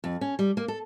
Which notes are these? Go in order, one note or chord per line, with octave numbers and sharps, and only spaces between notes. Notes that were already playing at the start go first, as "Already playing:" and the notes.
F2
C#4
G3
A#3
A4